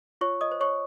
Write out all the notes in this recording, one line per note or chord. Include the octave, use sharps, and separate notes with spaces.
F4 C#5 C#6
D#5 D#6
C5
C#5 C#6